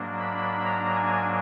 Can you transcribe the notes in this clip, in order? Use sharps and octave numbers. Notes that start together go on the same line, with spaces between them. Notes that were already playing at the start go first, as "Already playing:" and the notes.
Already playing: G#2 F#3 A#3 D4
B5
A#5
G#5